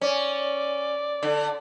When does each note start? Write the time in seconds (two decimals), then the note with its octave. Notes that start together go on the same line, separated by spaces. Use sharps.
0.01 C#4 D5
1.23 D3